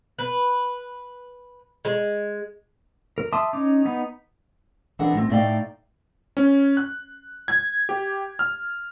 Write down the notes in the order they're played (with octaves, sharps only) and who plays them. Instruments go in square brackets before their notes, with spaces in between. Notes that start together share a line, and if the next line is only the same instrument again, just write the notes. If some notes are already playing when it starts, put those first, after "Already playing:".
[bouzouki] B4
G#3
[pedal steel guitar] A#4
E5 A5 C6 D6 D#6
C#4 D#4 D6
B3 D#4
[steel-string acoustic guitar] E3 C4 D4 G#4 A#4 F#5
A2 C4
A2 A3 D#4 D5 F5 G5
[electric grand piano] C#4
F#6
G#6
G4
F6